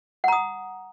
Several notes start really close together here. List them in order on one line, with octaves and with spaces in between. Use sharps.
F#5 A#5 D#6